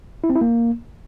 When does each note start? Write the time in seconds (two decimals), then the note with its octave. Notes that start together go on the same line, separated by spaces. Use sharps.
0.24 E4
0.30 C4
0.35 E4
0.41 A#3